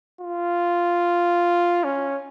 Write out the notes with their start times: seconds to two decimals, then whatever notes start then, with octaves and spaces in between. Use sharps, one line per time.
0.21 F4
1.84 C#4